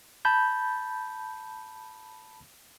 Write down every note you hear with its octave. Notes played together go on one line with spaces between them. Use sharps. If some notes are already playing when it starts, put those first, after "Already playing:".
A5 B5 G6